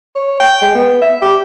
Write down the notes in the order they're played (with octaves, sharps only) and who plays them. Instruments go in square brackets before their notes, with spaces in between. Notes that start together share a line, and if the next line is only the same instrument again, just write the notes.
[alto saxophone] C#5
G5
G#3
B3
E5
G4